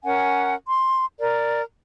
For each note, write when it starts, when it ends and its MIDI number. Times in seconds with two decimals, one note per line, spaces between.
0.04 0.54 61
0.04 0.54 70
0.04 0.54 78
0.04 0.54 80
0.67 1.05 84
1.19 1.61 70
1.19 1.61 74